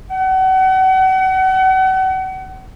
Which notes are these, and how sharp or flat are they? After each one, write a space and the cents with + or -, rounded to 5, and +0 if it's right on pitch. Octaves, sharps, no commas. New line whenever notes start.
F#5 +35